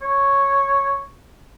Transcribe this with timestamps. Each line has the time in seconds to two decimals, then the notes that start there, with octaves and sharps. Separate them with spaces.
0.02 C#5